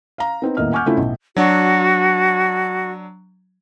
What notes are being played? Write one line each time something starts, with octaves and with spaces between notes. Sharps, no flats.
F5 A#5
B3 C4 D#4
D#1 E2 A2 A#3 D#5 F6
F#5 G#5 C#6 D6 F6 G6
C#3 A3 C4 C#4 E4 F4
B1 A2
F#3 D4 F#4